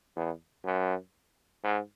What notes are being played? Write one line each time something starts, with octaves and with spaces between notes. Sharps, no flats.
E2
F#2
G#2